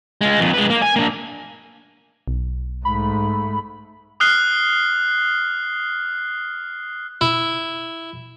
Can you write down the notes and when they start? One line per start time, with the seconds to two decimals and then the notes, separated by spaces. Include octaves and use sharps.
0.21 G#3 F4
0.40 F2 A#2
0.54 G#3 B4
0.70 A#3
0.82 G#5
0.96 A#3 D4
2.28 B1
2.85 G#2 A3 B5
4.20 D#6 F6 F#6 C7 G7
7.21 E4